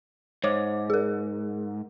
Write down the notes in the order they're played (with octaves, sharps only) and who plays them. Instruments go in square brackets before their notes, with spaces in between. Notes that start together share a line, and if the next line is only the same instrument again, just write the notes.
[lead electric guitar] G#2 [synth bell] C5 C#5 D6
[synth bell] G#4 A#4